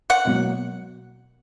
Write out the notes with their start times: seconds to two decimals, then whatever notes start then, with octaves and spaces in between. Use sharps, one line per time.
0.10 F#5
0.25 B2 F#3 A#3